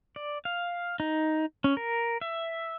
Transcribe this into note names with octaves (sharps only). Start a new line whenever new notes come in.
D5
F5
D#4
C#4
A#4
E5